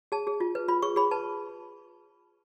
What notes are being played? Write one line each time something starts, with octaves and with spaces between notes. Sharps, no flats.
G#4 A5
G#4
F4
B4
F4 B5
G#4 C#6
G#4 B5
B4 A5